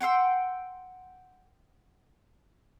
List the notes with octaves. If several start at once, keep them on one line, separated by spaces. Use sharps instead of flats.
F#5 G5 C6 E6